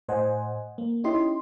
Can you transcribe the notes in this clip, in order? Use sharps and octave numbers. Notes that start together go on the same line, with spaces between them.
A2 C5 D#5 F#5 G#5
A#3
C#4 D#4 E4 G4 D#5 C6